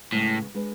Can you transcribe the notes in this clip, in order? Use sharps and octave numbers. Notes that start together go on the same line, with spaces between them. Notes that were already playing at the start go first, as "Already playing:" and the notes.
A2 C#3 G#3 B3
G#3 D4 G#4 B4